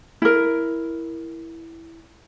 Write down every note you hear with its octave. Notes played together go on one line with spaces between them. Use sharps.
E4 A#4